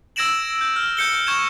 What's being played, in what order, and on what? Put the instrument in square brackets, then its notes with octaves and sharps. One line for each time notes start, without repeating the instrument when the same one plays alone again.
[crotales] E6 G#6 A#6 D7 E7 F#7
G6
F6
G6 C#7 G7
C#6 G6 G#6 E7